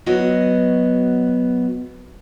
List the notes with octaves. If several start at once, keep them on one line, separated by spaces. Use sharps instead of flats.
F#3 B3 F#4 D#5